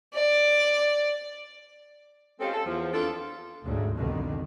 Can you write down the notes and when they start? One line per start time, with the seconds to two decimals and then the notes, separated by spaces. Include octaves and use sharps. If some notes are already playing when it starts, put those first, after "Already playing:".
0.15 D5
2.41 G#3 C4 C#4 F4 G4 A4
2.54 A4
2.66 E2 F3
2.93 F2 D4 F4 A4
3.63 D2 G#2 C#3
3.94 C2 F2 B2 D3 D#3